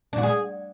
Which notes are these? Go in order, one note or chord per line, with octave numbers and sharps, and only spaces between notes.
D4
F#4
G#4